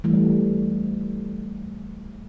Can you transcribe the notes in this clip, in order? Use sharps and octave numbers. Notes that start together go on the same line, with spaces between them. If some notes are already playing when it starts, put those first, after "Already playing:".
E3 G3 A3